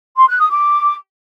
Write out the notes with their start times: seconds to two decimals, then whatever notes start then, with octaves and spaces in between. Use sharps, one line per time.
0.17 C6
0.28 F#6
0.40 D#6
0.51 D6